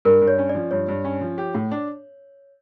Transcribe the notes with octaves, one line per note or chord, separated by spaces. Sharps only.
G2 A#4
G2
C#5
C#4
D5
F3
G2 C#5
G2
C#4
F3
G4
A2
D4